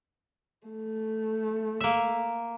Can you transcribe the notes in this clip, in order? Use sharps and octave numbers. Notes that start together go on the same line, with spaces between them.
A3
A#3 E5